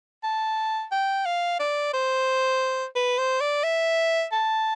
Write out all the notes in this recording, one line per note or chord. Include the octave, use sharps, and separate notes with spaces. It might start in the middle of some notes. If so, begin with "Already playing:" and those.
A5
G5
F5
D5
C5
B4
C5
D5
E5
A5